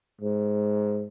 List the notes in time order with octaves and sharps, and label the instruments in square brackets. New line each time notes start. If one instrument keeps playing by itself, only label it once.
[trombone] G#2